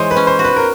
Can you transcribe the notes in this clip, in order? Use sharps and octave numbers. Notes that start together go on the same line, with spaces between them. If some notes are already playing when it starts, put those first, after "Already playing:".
Already playing: E3 G#3 C5 C#5
B4
C#4
C5
F#4
B4
A#4